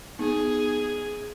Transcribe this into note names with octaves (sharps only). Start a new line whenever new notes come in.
B3 D#4 G#4